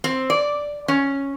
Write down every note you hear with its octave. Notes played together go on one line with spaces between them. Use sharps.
C4
D5
C#4